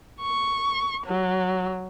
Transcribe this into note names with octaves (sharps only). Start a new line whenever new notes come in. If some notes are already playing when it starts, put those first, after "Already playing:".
C#6
F#3